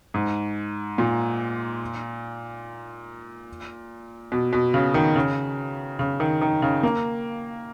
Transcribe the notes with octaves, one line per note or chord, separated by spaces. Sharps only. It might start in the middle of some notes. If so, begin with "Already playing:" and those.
G#2
A#2
B2
B2
C#3
D#3
C#3
C#3
D#3
D#3
C#3
A#3